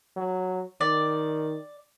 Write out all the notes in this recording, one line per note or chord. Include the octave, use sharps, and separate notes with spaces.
F#3
D#3 D5